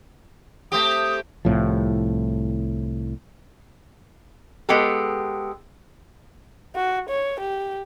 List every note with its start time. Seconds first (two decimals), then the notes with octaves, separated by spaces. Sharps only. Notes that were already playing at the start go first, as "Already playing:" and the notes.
0.72 A3 C4 G4 D#6
1.45 C2 A2 F3
4.69 G#3 B3 G4 A4
6.75 F#4
7.09 C#5
7.40 G4